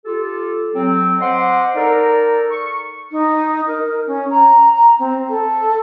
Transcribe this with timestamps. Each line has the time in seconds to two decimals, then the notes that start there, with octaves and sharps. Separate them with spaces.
0.05 F4 G4 A4
0.74 F#3 C4
1.20 C5 D#5 F#5 C6 D6
1.75 D#4 A4 A#4 D5
2.51 C#6
3.12 D#4
3.67 A#4
3.85 A#4
4.07 C#4
4.31 A#5
4.73 A#5
4.99 C4
5.29 A4